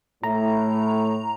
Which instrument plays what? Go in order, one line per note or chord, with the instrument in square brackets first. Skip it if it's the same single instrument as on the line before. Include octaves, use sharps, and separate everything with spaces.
[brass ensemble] A2 [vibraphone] E4 A4 E5 [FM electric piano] A#5